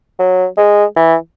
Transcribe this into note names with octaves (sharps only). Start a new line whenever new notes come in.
F#3
G#3
E3